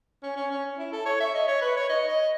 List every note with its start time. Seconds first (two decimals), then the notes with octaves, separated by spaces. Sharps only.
0.23 C#4
0.36 C#4
0.51 C#4
0.78 E4
0.92 A4
1.06 C#5
1.20 E5
1.35 D#5
1.48 C#5
1.62 B4
1.77 C#5
1.89 D#5
2.08 D#5